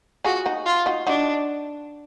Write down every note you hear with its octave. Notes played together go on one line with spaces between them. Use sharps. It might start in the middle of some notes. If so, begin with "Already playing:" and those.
F4 F#4 G#4
D#4 F#4
F4
D#4 F#4
D4 D#4 F#4